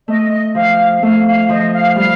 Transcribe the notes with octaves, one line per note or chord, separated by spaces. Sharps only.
A3 D#5
F3 F5
A3 F5
F5
F3 D#5
F5
G3 F5